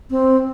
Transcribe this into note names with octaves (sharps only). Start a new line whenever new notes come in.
C4